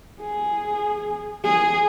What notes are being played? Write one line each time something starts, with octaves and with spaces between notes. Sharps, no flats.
G#4
G#4